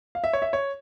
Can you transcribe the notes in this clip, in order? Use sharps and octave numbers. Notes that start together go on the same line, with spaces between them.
F5
E5
C#5
E5
C#5